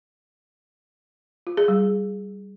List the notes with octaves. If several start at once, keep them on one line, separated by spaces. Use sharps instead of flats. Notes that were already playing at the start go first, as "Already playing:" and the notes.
F4
G#4
G3